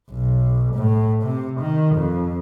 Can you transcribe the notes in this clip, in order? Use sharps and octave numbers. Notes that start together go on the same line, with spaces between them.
B1
A2
C3
D#3
F2